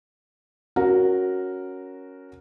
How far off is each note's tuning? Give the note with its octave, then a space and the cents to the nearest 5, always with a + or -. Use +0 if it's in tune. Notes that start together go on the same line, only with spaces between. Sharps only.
C#4 +0 F#4 +0 A#4 +0